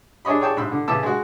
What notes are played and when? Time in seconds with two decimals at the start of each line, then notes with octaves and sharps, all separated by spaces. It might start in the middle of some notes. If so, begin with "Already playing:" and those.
0.25 D4 G#4 C#5 D#5 B5
0.41 G#4 C#5 D5 G5 A5
0.57 G#2 B5 E6
0.71 D3
0.88 C#3 E3 A5 D6 E6
1.03 G#3 F#4